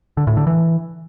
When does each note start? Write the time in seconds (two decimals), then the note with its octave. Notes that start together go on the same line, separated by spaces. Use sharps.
0.17 D3
0.27 A2
0.37 D3
0.47 E3